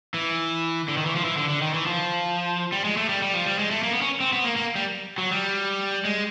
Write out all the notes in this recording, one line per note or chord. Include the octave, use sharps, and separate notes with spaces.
E3
D3
D#3
E3
F3
E3
D3
D3
D#3
E3
F3
G3
G#3
A3
G3
G3
F3
G3
G#3
A3
A#3
B3
C#4
C4
B3
A#3
A#3
G3
F#3
G3
G#3